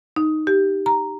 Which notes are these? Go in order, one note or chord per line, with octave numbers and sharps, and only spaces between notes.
D#4
G4
A#5